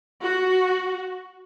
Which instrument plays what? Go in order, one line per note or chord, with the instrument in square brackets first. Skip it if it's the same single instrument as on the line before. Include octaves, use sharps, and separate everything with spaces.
[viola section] F#4